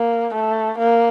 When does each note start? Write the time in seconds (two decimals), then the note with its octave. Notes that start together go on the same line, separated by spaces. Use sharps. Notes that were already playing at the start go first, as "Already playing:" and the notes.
Already playing: A#3
0.35 A3
0.78 A#3